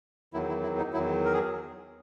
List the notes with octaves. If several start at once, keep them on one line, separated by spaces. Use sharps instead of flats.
E2 D#3 F#3 E4
E4
E4
D#4
E2 D#3 F#3 E4
A#4
G#4